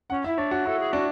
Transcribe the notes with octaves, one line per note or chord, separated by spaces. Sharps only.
C#4 F#5
E4 E5
D4 C#5
F#4
E4 A4
G#4
D4 F#4